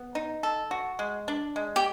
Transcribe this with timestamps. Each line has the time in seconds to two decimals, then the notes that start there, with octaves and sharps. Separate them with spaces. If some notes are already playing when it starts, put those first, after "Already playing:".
Already playing: B3
0.15 D#4
0.43 A4
0.71 F#4
0.99 G#3
1.28 D4
1.56 G#3
1.76 G4